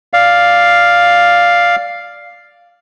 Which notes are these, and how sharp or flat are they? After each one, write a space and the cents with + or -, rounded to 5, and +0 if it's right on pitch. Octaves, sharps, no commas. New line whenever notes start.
D5 +0 F5 +0